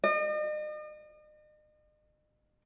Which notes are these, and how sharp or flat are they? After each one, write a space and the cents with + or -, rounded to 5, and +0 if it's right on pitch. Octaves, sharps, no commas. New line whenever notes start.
D#5 -40